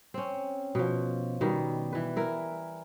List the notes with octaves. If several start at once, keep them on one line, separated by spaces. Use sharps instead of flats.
C4 C#4
B2 F3
B2 D#3 G3
E3 B4
E4 A#4